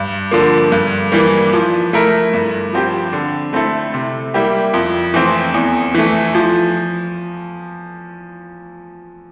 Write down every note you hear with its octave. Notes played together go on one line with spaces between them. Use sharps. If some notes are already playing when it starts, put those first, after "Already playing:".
Already playing: G2
D3 F3 A#3
G2
E3 G3 A#3
F3
A3 E4 A#4
G2
F3 C4 G4
D3
A3 C4 E4 A4
C3
G3 A#3 E4 G4
F2
E3 A3 C4
E2
E3 A3
F3